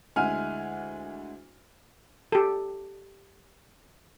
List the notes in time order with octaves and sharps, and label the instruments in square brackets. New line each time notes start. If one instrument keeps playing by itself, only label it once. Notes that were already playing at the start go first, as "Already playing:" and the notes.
[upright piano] D2 G#3 E4 F#5 G#5 F6
[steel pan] G4 A4